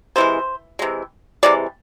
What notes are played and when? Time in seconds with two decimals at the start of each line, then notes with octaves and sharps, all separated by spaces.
0.16 C3 E3 G#3 C5
0.79 C3 E3 G#3
1.43 C3 E3 G#3 D5